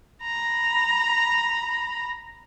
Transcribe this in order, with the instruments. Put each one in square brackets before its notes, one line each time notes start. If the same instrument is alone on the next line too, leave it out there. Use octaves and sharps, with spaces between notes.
[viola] A#5 B5